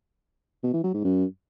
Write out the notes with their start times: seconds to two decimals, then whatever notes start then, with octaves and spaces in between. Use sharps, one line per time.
0.64 B2
0.74 E3
0.84 F#3
0.94 G#2
1.04 F#2